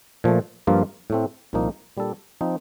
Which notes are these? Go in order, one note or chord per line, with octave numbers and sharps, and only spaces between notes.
A#2 F3 A3
G2 F3 A#3 F4
A2 A3 C4
C2 A#2 F3 A#3 D#4
A#2 G3 D4 A4
F3 C4 D#4